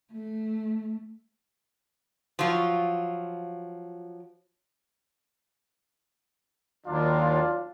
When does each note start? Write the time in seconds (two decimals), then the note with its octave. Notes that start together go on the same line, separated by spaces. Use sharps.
0.12 A3
2.39 F3 F#3 F4
6.86 D#2 F#3 D4 F4